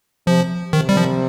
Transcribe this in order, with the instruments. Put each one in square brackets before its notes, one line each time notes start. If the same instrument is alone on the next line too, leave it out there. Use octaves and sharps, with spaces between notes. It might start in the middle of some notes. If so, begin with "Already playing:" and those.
[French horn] C3 [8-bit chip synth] F3
[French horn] C3 [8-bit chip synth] D#3
[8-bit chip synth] G3
F3